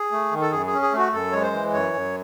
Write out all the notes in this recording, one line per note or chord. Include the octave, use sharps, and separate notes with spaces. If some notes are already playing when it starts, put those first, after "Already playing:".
Already playing: G#4
A3
D#3
A4
F#2 G#4
G#4
C#4
G#4
A3 F#4
F#2 A4
G#3 C#5
C5
E3
F#2 C#5
F#2